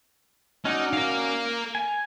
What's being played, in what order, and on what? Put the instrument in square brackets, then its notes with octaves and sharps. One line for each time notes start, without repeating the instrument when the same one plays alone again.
[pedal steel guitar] C#4 F#4 D5 [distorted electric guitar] D#4
[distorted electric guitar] A#4 F5
[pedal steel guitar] G#5